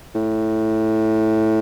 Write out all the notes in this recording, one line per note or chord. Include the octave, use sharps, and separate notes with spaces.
A2